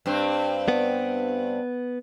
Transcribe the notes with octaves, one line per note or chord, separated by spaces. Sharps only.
G2 C4
B3